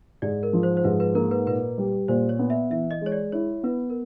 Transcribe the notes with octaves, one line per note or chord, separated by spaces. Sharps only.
G#2 D5
A#4
F3
C5
C5
G#2 B4
B4
A#3 A#4
B4
A#2 B4
G3
A#2 C5
C#5
B3
E5
E3 E5
D#5
G#3 C#5
D5
E4 C#5
B3 B4
A#4